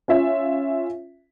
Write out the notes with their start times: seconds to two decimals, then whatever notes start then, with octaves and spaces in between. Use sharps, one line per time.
0.08 C#4 F4 E5